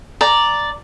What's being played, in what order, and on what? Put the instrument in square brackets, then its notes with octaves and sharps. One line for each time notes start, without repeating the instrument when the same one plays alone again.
[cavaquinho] D5 A#5